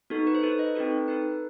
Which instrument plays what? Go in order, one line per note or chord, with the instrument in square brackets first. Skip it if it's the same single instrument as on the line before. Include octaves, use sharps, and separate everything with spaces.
[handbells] B3 D#4 F#4 A4
B4
C5
D#4 A4 B4
C5
D#5
C4 D#4 F#4 A4 B4
A4
D#4 A4 B4